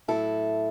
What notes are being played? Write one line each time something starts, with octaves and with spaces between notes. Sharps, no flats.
A2 F#3 E4 A4